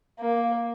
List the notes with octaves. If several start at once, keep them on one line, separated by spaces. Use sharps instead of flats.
A#3